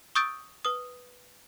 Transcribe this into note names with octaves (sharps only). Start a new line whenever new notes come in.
C#6 D#6 E6 G6 A6 D7
B4 D#6